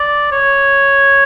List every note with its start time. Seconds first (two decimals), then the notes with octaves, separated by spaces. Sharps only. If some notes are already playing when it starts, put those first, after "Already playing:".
Already playing: D5
0.32 C#5